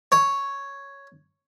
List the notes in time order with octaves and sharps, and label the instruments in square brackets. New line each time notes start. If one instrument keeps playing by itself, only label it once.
[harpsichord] C#5